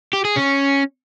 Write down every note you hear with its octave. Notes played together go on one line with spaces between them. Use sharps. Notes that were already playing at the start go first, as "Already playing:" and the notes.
G4
G#4
C#4